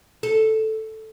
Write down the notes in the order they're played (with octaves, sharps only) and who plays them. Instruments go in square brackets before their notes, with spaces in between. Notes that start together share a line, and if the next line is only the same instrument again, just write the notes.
[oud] A4